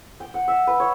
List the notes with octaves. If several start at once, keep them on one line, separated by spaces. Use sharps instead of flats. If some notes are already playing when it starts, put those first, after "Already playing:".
G5
F#5
E5
B4
C#5